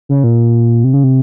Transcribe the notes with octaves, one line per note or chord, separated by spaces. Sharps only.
C#3
A#2
C3
C#3
C3